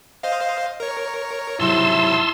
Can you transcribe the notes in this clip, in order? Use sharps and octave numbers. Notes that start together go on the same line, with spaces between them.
C5 D#5 F5
A#4 C#5
G#2 C3 F#3 E4 A5 C6 E6